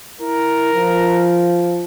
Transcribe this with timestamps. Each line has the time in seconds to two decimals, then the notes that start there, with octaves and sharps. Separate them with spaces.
0.21 E4 A#4
0.73 F3